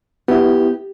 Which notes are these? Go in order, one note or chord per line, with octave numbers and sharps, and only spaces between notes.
B3 E4 G4